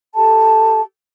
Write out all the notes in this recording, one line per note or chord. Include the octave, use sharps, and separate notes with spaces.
G4 A4 A5